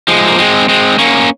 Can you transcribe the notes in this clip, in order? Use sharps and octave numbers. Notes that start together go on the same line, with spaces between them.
F3 G#3
A#3
G#3 C4
G#3 C4
A#3 C#4